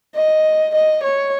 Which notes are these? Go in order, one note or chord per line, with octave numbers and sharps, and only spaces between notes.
D#5
D#5
C#5